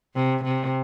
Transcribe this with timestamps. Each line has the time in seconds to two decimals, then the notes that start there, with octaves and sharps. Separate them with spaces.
0.15 C3
0.44 C3